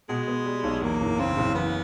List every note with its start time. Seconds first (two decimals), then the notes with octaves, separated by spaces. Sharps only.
0.09 B2 G#3
0.28 B3
0.45 G3
0.64 B1
0.82 E2 A#3
1.00 F#1
1.18 C#3 C4
1.37 F#1
1.55 E3 B3